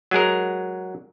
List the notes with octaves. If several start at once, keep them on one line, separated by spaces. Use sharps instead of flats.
F#3 G#3 G#4 A#4